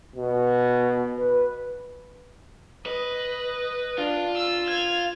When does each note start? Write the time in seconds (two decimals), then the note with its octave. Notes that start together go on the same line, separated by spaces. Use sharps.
0.16 B2
1.19 B4
2.86 B4 D#5
3.98 D4 F4
4.36 E6
4.67 G#6 F7